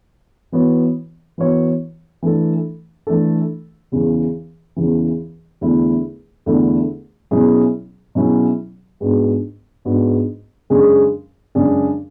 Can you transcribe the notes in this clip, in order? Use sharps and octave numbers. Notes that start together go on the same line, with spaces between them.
E3 B3 F#4 C#5
E3 B3 F#4 C#5
E3 A3 D4 A4
E3 A3 D4 A4
E2 C#3 E3
E2 C#3 E3
E2 D3 A3 E4
E2 D3 A3 E4
B2 F#3 C#4 E4 G#4
B2 F#3 C#4 E4 G#4
G#2 G#3 B3 D4 F#4
G#2 G#3 B3 D4 F#4
F#2 C#3 G#3 D4 G#4
F#2 C#3 G#3 D4 G#4